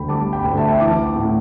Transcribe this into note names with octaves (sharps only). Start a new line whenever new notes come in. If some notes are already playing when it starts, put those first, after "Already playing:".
Already playing: D2 D3 G5 B5
G3 A5 D6
G5 B5
D2
E5 A5
E3 A5 D6
A2